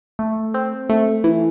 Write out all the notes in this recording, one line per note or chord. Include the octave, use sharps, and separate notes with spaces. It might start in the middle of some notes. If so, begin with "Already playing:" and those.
A3
C4
A3
E3